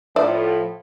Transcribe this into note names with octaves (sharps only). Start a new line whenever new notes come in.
A2 F3 D5 E5